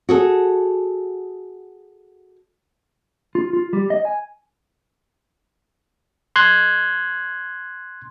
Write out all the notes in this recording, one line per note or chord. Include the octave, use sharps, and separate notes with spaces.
F#4 G#4 A4
F4
F4
G3
D#5
G#5
C6 F#6 G#6